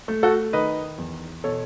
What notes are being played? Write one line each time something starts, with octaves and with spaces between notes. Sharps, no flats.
A3
F#4 A4
D#3 B4 D#5
E2
B2 A4 C#5